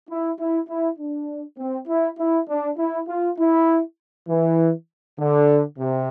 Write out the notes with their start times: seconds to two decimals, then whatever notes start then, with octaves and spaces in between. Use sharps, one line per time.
0.08 E4
0.39 E4
0.68 E4
0.99 D4
1.58 C4
1.88 E4
2.18 E4
2.48 D4
2.78 E4
3.08 F4
3.38 E4
4.29 E3
5.19 D3
5.79 C3